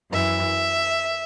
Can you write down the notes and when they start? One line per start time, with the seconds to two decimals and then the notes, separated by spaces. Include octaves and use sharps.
0.10 F#2 E3 E5